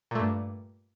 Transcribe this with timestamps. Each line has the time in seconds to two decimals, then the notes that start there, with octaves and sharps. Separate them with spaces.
0.11 A#2
0.15 A3
0.19 G2